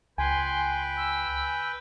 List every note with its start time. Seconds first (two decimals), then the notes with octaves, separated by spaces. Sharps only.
0.18 C#2 B4 G5 G#5 C6
0.97 E6